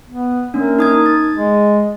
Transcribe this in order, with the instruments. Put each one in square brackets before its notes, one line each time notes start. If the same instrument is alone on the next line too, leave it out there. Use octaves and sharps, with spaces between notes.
[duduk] B3
[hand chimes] A#3 C#4 D4 [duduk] A#4
[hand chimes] D#4 D#6 G#6
A6
[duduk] G#3